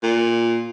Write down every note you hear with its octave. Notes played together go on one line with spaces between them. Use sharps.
A#2